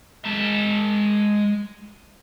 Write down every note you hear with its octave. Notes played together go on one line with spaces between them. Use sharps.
G#3 A5